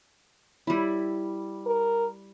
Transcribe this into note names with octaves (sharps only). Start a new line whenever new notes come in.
G3 E4
A#4